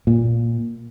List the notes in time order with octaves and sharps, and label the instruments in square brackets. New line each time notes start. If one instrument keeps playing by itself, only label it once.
[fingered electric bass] A#2